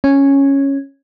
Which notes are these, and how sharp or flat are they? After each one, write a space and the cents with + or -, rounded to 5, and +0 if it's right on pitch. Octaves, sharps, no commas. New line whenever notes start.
C#4 -5